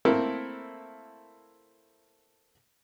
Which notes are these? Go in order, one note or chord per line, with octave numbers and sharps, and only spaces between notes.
A3 A#3 C4 E4 A4 A#4